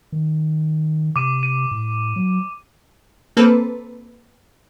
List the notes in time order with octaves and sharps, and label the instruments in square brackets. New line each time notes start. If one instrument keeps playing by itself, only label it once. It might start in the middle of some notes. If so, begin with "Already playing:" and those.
[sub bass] D#3
[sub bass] C3 [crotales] D6 D#7
[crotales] D#7
[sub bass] A2
F#3
[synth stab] A#3 C4 A4 B4